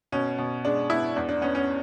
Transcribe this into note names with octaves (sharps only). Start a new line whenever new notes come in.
B2 C#4
B2
G#3 D4
B3 E4
E2 D4
D4
B3 C#4
C#4